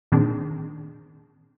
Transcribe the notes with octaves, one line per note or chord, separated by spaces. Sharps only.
A#2 D#3 C4 D4 G#4